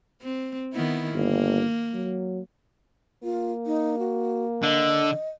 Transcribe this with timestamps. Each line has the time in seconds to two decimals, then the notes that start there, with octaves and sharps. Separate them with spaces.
0.22 C4
0.73 D#3 B3 E4
1.14 G1 A#3
1.94 F#3
3.23 A#3 F4
3.66 D#4
3.99 F#4
4.63 D3 D#5